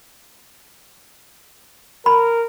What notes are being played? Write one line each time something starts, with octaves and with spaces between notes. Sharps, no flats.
A#4 B5